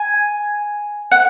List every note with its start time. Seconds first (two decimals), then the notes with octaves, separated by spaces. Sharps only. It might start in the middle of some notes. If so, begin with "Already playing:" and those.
Already playing: G#5
1.12 F#5